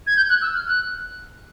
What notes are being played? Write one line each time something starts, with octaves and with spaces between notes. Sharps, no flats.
G#6
G6
F#6
E6
F6
F#6